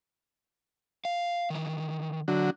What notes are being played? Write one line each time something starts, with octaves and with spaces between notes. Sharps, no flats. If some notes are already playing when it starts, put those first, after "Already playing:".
F5
D#3 E3
D3 F#3